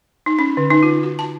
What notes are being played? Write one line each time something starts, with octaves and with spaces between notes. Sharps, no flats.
D#4
C#4
D3
D#4
F4
F#4
A5